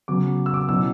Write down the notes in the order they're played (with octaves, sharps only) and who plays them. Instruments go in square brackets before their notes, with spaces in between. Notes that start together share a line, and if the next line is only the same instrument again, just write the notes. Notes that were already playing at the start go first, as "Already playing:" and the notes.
[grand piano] C#3 F#3 B3 D6
E6
D6
B2 F#3 C#4 E4 E6